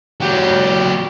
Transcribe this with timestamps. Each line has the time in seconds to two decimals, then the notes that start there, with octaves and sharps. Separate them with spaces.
0.20 F#3 G4